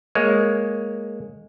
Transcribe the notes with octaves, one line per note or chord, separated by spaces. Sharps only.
G#3 A#3 C#5